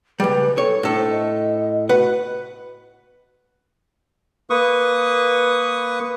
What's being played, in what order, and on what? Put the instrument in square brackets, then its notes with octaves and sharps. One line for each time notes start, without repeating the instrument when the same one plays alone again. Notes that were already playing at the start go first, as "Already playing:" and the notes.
[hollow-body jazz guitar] C#2 G3 [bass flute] B4
[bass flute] A4 [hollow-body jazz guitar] C#5
[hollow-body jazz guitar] A2 A4 [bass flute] D4
[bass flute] C5
D#5
[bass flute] F#4 [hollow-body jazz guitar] B4 F#5
[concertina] A#3 B4 C#6 D#6